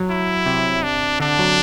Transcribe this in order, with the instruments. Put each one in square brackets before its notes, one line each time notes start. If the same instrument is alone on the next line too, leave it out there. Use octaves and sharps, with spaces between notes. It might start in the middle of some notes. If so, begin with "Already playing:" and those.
Already playing: [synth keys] F#3
[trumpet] E4
[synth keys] C3
[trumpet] D4
[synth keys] D3 [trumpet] D4
[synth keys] F#3